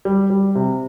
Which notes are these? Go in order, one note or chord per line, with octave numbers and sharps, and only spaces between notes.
G3
G3
C3